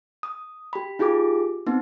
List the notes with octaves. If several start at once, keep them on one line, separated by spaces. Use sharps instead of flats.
D#6
G4 B5
D#4 F4 G4 G#4 D6
B3 C4 D#4